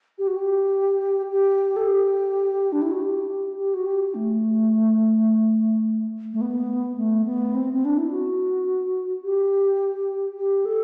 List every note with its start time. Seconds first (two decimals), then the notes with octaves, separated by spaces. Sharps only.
0.18 G4
0.27 F#4
0.36 G4
1.31 G4
1.76 A4
1.88 G4
2.72 D4
2.82 E4
2.91 F#4
3.01 G4
3.58 G4
3.74 F#4
3.86 G4
4.15 A3
6.33 A3
6.41 B3
6.98 A3
7.26 B3
7.54 C4
7.73 C4
7.85 D4
7.98 E4
8.11 F#4
9.24 G4
10.37 G4
10.65 A4